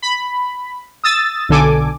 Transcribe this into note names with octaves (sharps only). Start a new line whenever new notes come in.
B5
D#6 E6 A6
B1 D3 A4 G#5 D6